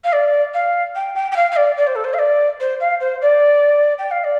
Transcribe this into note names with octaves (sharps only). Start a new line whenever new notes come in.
F5
D5
F5
G5
G5
G5
F5
F5
D5
D5
C5
A4
C5
F5
D5
C5
F5
C5
D5
G5
F5
D5